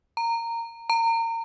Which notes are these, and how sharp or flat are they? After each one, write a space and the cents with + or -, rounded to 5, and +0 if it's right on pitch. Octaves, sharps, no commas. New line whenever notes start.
A#5 -15
A#5 -30